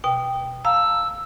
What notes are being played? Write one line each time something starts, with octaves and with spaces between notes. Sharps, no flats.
B2 G5
F5 A5 A#5 E6